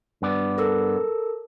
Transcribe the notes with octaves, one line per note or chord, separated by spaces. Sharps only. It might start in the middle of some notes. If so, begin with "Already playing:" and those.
G2 B3 D5
A4 A#4 E6